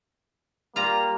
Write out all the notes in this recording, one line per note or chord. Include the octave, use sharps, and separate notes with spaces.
G3 A#3 F4 A#5